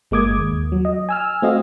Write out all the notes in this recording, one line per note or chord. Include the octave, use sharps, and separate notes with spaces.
G1 G#3 A#3 D6 D#6 G#6
D#2
F#3
D#5
G#5 E6 F6
A3 C4 F#4 D#5 F5